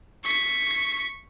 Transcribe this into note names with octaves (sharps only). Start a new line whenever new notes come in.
C#6 B6